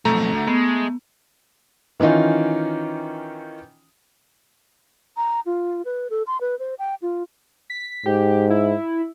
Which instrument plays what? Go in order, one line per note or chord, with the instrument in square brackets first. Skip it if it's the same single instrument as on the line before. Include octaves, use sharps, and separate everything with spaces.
[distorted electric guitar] B1 F2 [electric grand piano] A3 A#5
[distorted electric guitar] D2
[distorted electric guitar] G#3 [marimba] B3
[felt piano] D#3 E3 C#4 D#4 F4
[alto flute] A#5
F4
B4
A4
C6
B4
C5
G5
F4
[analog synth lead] B6
[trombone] G#2 [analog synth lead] G4
[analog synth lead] E4